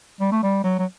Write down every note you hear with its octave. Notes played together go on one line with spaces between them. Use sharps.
G3
A3
G3
F#3
F#3